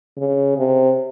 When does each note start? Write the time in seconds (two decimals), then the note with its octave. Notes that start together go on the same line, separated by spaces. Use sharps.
0.17 C#3
0.56 C3